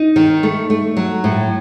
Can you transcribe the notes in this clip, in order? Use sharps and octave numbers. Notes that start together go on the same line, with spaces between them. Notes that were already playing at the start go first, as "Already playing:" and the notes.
Already playing: D#4
D#3
A3
A3
F#3
A2